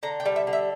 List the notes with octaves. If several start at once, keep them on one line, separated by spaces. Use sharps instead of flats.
D3 A#5
G5
G3
E5
D3
E5